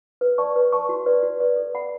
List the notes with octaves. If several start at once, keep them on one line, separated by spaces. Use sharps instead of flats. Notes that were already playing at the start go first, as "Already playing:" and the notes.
B4
D5 A5 C#6
B4
D5 A5 C#6
F#4
B4 D5
F#4
B4 D5
A4
D5 F#5 B5